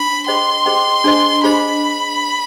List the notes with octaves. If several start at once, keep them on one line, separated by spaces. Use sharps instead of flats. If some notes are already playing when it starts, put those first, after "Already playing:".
Already playing: D4 B5
G#4 C5 D#5 G5 C6
G#4 C5 D#5 G5
D4 G#4 C5 D#5
D4 G#4 C5 D#5 B5